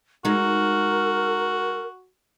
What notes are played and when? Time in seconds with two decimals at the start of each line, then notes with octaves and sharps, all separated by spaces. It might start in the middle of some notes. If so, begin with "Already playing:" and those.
0.25 G#3 D#4 F#4 A#4